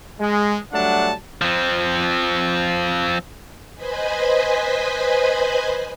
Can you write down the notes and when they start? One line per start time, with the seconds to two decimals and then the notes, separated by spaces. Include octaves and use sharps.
0.20 G#3
0.73 F#3 G3 A3 D4 F#5 A5
1.42 F3 C4
3.75 B4 C5 D#5 G#5 B5